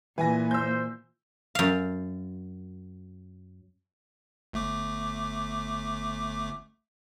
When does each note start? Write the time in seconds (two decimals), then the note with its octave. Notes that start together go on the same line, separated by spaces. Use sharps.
0.18 A#2 E3 B4 G#5 A#6
0.51 C5 E6 G6
1.55 F#2 F5
4.53 G1 A3 D6